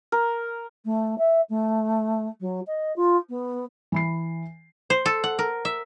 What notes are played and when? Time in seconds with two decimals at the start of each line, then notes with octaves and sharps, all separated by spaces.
0.12 A#4
0.85 A3
1.18 E5
1.49 A3
2.40 F#3
2.67 D#5
2.96 F4
3.29 B3
3.92 E3 B5 C7
4.90 C5
5.06 A4
5.24 F#5
5.39 A#4
5.65 E5